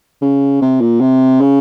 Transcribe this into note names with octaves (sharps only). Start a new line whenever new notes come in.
C#3
C3
A#2
C3
C#3